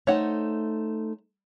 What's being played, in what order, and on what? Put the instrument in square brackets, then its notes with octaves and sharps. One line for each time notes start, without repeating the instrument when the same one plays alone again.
[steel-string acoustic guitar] A3 D#4 C5 [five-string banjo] C#5 F#5